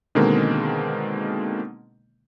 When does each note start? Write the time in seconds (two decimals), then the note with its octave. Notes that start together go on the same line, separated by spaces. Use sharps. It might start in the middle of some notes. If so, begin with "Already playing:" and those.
0.15 B2 D3 D#3 G#3 A#3 C4